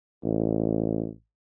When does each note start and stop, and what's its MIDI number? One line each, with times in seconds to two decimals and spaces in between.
0.24 1.08 33